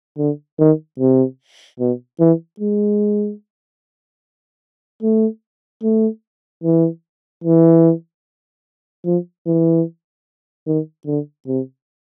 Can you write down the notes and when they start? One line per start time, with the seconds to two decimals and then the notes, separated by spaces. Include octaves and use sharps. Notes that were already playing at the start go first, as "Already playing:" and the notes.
0.18 D3
0.59 D#3
1.00 C3
1.80 B2
2.20 E3
2.60 G#3
5.02 A3
5.83 A3
6.64 E3
7.44 E3
9.05 F3
9.46 E3
10.67 D#3
11.06 D3
11.48 C3